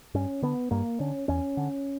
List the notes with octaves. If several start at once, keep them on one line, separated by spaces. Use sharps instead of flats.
G2 C#4
D3 B3
G2 A#3
D3 C#4
E2 C#4
D3